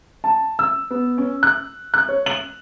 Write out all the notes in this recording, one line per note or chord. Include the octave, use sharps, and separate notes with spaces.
A5
E6
B3
C#4
F#6
F#6
C#5
F#7